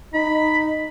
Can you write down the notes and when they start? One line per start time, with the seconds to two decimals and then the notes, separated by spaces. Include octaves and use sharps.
0.14 D#4 B5